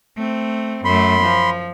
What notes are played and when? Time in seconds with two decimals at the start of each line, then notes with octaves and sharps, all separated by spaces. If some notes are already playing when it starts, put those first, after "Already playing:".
0.17 A3 C4
0.85 F#2 A3 B5 C6
1.21 F3